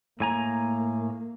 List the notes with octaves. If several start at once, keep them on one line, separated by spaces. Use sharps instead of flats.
A2 A#3 G#5 A#5